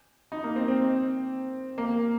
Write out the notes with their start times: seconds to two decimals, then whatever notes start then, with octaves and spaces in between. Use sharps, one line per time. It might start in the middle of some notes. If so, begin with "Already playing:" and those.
0.32 D#4
0.44 A#3
0.56 C4
0.68 C4
1.78 A#3